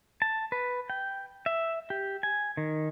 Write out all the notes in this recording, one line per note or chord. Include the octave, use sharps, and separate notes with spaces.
A5
B4
G5
E5
G4
G#5
D#3